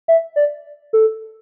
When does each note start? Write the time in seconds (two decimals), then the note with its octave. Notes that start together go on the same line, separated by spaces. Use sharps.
0.08 E5
0.36 D5
0.93 A4